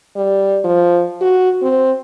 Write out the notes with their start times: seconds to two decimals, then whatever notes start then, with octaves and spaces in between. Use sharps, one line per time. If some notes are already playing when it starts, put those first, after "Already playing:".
0.16 G3
0.64 F3
1.22 F#4
1.62 C4